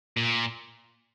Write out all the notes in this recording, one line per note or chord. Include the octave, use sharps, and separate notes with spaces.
A#2